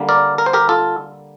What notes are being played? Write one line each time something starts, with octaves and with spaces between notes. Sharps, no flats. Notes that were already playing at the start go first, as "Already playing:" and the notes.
Already playing: D3 G3 A#3
A#4 D5
A#4
C5
G4 A#4
F4 A4